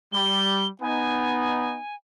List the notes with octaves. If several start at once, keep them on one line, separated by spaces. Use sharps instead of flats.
G3 G7
B3 D#4 G#5